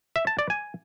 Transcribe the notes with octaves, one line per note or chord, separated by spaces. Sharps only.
E5
A5
D5
G#5